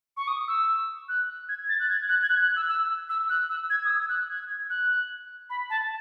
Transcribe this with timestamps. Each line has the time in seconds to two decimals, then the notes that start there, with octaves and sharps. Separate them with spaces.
0.17 C#6
0.28 D#6
0.48 E6
1.09 F#6
1.49 G#6
1.69 A6
1.80 F#6
1.89 G#6
2.09 F#6
2.23 G#6
2.29 F#6
2.42 F#6
2.56 E6
2.69 E6
3.09 E6
3.29 F#6
3.49 E6
3.70 G#6
3.85 D#6
3.90 E6
4.09 F#6
4.30 G#6
4.70 F#6
5.50 B5
5.70 A5